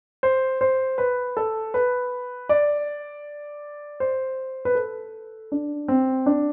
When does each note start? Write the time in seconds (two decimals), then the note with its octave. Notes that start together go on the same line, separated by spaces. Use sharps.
0.23 C5
0.61 C5
0.98 B4
1.37 A4
1.74 B4
2.49 D5
4.00 C5
4.65 B4
4.75 A4
5.52 D4
5.88 C4
6.26 D4